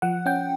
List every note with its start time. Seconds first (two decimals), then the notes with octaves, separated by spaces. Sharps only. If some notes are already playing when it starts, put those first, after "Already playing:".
0.02 F3 F#5
0.26 C#4 G5